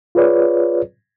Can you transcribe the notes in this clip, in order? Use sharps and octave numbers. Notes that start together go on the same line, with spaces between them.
F4 G#4 B4 C#5 D5